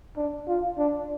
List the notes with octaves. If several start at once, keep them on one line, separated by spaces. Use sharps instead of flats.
D4
F4
D4